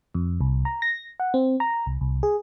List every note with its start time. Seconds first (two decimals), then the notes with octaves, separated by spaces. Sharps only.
0.14 F2
0.41 C2
0.65 A#5
0.82 A#6
1.20 F#5
1.34 C4
1.60 A#5
1.86 C2
2.01 C2
2.23 G#4